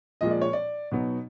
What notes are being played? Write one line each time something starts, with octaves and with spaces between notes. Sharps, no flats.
A#2 F3 G#3 D#5
D5
C#5
D5
B2 F#3 B3 D#4